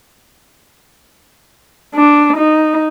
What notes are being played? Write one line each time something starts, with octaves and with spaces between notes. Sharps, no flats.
D4
D#4